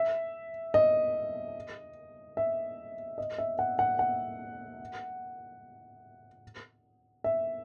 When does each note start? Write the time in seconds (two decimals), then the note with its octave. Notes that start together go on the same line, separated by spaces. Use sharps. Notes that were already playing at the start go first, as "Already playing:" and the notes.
Already playing: E5
0.74 D#5
2.37 E5
3.18 D#5
3.38 E5
3.59 F#5
3.79 F#5
3.99 F#5
7.24 E5